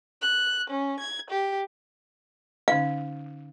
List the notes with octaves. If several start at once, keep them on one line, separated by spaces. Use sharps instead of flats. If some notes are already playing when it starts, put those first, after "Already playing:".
F#6
C#4
G#6
G4
D3 C#4 D#4 F5